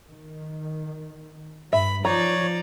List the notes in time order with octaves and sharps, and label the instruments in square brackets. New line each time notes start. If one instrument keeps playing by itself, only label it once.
[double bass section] D#3
[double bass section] G2 [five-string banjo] E5 [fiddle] B5
[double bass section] F3 [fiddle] D#4 D5 [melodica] C#5 [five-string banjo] A#5